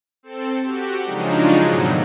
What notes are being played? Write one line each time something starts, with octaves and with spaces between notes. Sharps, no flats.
C4 A4
F#4 G4
C#3 F3 F#3 G#3 D4 D#4
G#2 B2 D#3 F#3 A3 E4